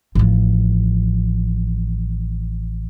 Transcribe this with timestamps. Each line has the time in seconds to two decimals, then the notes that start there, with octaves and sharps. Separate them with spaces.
0.15 A1 F3